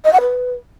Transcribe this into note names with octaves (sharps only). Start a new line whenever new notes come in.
D#5
F#5
B4